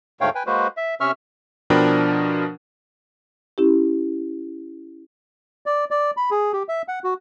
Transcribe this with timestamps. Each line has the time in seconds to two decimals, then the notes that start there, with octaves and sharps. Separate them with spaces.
0.21 D2 G#2 A3 C#5 F5 G5
0.35 B4 G5 G#5
0.47 G#3 A#3 F#4 B4 C5
0.77 E5
1.01 C3 C#4 E5 C#6 E6 F6
1.70 B2 F3 D4 A#4 G5 B5
3.58 C#4 E4 G4
5.66 D5
5.91 D5
6.17 B5
6.31 G#4
6.53 G4
6.69 E5
6.88 F#5
7.04 F#4